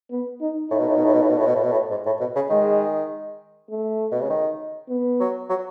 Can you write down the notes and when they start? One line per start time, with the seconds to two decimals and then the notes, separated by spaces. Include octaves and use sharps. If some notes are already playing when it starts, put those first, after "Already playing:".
0.11 B3
0.41 D#4
0.71 A2 D#4
0.79 B2
0.88 A2
0.96 B2
1.04 A2
1.14 B2
1.22 A2
1.29 B2
1.38 A2
1.46 B2
1.55 A2
1.63 B2
1.72 A2
1.91 G#2
2.06 A2
2.20 B2
2.35 C#3
2.50 D#3 G#3
3.70 A3
4.12 B2
4.21 C#3
4.30 D#3
4.89 B3
5.20 F#3
5.50 F#3